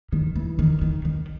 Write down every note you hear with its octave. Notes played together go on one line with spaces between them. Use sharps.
D#3
E3
D#3
D#3
D#3